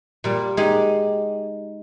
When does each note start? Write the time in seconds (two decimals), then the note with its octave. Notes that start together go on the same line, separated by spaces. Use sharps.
0.24 A#2 G3
0.57 G#3 D#4 G4